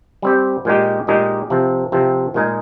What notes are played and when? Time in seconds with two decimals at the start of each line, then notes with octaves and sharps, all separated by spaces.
0.22 G3 C4 G4
0.65 A#2 G#3 D#4 G4
1.07 A#2 G#3 D#4 G4
1.50 C3 F3 C4
1.92 C3 F3 C4
2.34 A#2 G#3 D#4 G#4